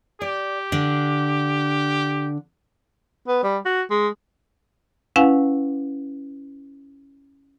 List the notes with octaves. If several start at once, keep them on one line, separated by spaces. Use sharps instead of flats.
G4 D5
D3 D4
B3
G3
F#4
G#3
C#4 E4 B4 F5 F#5 G#5